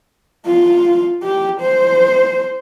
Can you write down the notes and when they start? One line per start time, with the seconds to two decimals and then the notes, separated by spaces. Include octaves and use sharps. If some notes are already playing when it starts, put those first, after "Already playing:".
0.47 F4
1.22 G4
1.61 C5